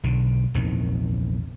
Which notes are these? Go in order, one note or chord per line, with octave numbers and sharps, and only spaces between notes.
B1 D3
A#1 E2 C3 D#3